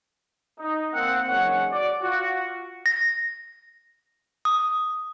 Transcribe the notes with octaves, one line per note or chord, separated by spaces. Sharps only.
D#4
A#3 C4 F#5
F#1 G#2 G#4 C#5 F#5
F#4 D5
F4 F#4
A#6
D#6